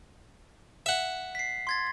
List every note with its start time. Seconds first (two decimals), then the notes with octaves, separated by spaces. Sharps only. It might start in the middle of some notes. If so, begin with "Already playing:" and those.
0.86 E5 F#5
1.35 B6 C7
1.67 C6 G#6 A6